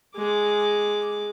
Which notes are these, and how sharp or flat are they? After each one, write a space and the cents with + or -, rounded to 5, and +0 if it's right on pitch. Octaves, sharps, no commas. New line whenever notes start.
G#3 +0 D6 +0